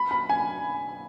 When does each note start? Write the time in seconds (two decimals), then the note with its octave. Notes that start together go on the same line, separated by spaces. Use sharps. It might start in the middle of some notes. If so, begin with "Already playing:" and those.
Already playing: B5
0.11 B5
0.29 G#5